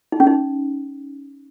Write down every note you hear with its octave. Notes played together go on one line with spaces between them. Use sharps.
D#4
C#4
D#4